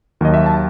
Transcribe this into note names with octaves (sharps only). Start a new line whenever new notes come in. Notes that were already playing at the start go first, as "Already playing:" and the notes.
D#2 D#3 F#3 D#5
E5
A5